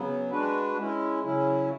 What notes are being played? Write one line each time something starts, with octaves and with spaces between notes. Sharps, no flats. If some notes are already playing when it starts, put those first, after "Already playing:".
Already playing: C#3 F#3 B3
G#3 D4 F#4 B4
G#3 C#4 E4
C#3 F#3 C#4 E4